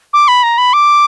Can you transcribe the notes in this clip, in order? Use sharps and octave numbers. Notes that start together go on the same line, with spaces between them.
D6
B5
A#5
B5
D6